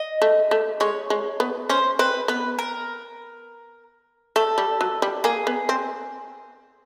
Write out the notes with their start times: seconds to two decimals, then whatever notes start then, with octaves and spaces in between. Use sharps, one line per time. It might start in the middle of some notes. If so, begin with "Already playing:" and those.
Already playing: D#5
0.22 A3
0.51 A3
0.80 G#3 C#5
1.10 G#3
1.40 B3
1.69 C#4 C5
1.99 C4 B4
2.28 B3 B4
2.59 A#4
4.36 A3 A4
4.58 G3
4.81 F#3
5.02 G3
5.24 A#3 G#4
5.47 B3
5.69 C4